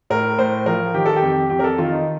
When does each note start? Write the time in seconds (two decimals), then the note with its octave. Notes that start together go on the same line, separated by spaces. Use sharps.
0.10 A2 A#4
0.38 A2 C5
0.66 F3 A#4
0.94 D#3 G4
1.06 A4
1.16 G4
1.22 F2
1.50 F2 G4
1.59 A#4
1.64 A4
1.78 D#3 F4
1.92 D#4